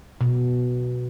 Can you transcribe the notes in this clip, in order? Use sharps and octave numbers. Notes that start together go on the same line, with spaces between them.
B2